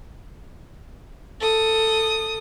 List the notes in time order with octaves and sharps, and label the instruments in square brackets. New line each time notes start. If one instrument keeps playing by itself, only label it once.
[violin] A4 D#6